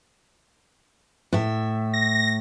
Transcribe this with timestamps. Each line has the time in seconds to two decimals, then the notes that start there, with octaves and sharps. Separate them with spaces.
1.33 A2 E5
1.94 A#6